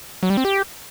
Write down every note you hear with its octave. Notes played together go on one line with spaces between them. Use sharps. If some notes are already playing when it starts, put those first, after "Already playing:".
F#3
G3
C4
G4